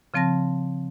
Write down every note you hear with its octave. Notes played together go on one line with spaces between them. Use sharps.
C#3 F3 C4 A5 A#6